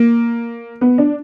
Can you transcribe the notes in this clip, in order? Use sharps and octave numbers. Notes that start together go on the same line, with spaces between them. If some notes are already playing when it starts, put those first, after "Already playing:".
Already playing: A#3
B3
D4